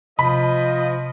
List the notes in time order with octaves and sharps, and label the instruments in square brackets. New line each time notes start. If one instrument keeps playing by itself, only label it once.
[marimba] C3 [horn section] F3 D#5 [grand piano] B5